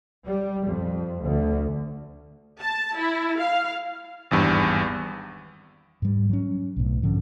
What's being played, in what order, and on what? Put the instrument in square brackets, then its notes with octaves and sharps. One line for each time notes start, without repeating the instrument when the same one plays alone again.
[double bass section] G3
F2
D2
[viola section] A5
E4
F5
[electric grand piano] G#1 E2 G2
[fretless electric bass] G#2 G3
F#3 C#4
B1 A2
G#2 D3 F3 C#4